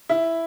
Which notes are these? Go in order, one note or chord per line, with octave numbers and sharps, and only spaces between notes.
E4